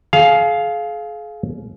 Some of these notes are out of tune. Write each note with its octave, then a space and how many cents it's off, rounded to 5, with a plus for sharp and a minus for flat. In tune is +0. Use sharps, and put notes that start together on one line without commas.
G#4 +40 F5 +0